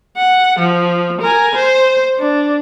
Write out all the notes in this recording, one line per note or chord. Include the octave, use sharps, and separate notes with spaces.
F#5
F3
A#4 G#5
C5
D4